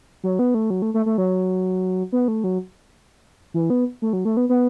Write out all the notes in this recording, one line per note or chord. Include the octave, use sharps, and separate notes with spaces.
F#3
B3
A3
F#3
A3
A3
A3
F#3
B3
A3
F#3
E3
B3
A3
F#3
A3
B3
B3